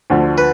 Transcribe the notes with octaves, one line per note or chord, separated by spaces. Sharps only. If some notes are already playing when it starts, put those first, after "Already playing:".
D2 D3 F3
B4